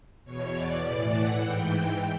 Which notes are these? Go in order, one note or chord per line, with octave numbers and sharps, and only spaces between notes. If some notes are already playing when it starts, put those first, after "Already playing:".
E2 B2 C#5
D5
A2 E3
F#5
G#2 E3 G5